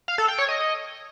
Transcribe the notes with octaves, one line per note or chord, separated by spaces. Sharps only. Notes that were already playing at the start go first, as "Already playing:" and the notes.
F5
A4
G5
C#5
D#5